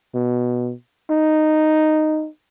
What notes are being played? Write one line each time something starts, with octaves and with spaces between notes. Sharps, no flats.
B2
D#4